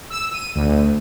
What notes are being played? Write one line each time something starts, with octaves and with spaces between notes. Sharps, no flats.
E6
D#7
D2